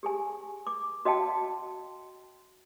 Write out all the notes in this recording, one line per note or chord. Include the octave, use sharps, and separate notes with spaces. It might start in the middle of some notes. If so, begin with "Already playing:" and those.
G4 G#4 G#5
D6
F#4 D#5 F5 G5 A5